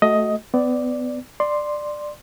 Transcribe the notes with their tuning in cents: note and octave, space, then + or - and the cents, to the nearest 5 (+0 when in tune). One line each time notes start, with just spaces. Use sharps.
A3 -5 F#4 +5 D#5 +10
B3 +30 D5 +0
D5 +15 C6 +0